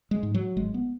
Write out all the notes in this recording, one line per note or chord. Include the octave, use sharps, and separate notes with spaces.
G#3
G#2
F#3
G#1 G#3
B3